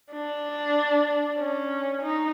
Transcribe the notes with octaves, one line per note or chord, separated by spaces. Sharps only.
D4
C#4
D#4